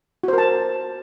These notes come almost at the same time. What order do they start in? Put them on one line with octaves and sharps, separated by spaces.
F#4 C5 A#4 A5